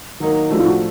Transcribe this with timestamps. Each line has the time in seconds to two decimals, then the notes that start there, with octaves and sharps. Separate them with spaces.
0.20 D#3 F#3 A#3 D#4
0.50 A2 F3 A3 D4 F#4
0.59 F4
0.65 F#4